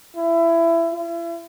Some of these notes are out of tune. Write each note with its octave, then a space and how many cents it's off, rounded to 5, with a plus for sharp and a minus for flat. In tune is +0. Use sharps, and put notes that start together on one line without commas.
E4 +20
E4 +40